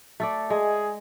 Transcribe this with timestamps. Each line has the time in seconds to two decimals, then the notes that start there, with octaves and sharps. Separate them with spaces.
0.20 A3 A4 D5
0.50 G#3 G#4